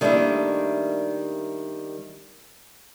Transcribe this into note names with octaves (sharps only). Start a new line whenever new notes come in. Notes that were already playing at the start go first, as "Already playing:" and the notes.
D#3 G3 A3 A#3 D4 E4